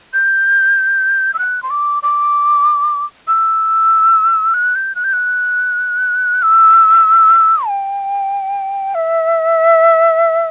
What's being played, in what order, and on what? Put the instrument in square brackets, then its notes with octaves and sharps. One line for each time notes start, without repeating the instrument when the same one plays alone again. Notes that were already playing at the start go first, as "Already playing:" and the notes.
[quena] G6
E6
F#6
C6
D6
D6
E6
F#6
G6
F#6
G6
F#6
E6
G5
E5